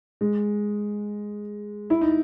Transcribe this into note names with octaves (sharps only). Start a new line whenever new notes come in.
G#3
E4
D#4